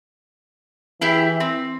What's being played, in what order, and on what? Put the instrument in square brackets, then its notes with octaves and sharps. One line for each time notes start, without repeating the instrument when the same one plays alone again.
[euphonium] E3 [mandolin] E4 G4 G#4
[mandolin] C4